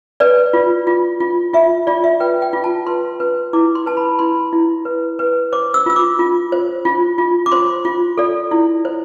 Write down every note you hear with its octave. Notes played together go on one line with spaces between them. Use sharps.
B4 D5
F4
F4
F4
F4 E5
F4 D5
E5
B4 G5
G5
F4
A5
B4 C6
B4
E4 D6
C6
B4 A5
B5
E4 C6
E4
B4
B4
C5 D6
E6
F4 E6
D6
F4
C5
F4
F4
D6
C5 C6
F4
A4 D5
E4
C5